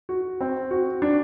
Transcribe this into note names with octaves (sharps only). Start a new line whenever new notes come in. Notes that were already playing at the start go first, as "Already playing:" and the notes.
F#4
C4
F#4
D4